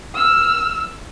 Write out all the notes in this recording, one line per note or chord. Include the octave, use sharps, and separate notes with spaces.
E6 F6